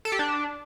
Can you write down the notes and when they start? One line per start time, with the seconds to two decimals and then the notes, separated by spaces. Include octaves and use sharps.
0.05 A4
0.12 G4
0.19 D4